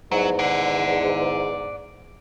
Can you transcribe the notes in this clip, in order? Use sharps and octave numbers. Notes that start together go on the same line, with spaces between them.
E2 G#2 F#3
D5 F#5